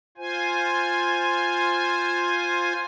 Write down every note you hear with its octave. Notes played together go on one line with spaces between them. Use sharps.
F4 C5 G#5